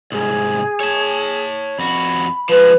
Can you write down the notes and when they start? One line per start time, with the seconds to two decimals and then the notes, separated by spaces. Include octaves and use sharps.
0.12 C2 G#2 G#4
0.81 C#5 A5
1.79 F2 F#4 B5
2.49 F3 G#3 B4